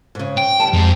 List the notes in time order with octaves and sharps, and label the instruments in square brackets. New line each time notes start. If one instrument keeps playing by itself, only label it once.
[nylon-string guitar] G#2 C#3
[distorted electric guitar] G5
[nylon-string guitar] D2 G3 A5
[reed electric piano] F2 [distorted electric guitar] G#2